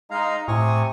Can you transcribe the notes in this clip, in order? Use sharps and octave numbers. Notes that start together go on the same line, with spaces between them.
G#3 D#4 F5 A#5
A2 C3 G#5 C#6 D#6